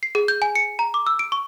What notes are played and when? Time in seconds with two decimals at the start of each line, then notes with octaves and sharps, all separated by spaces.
0.03 C7
0.15 G#4
0.28 G6
0.42 G#5
0.55 C#7
0.79 A#5
0.94 D6
1.07 E6
1.19 D7
1.32 C#6